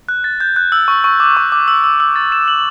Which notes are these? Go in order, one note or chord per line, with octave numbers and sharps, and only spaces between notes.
F#6
A6
G6
F#6
E6
C#6
C#6
D6
C#6
D6
E6
E6
E6
A6
E7
F#7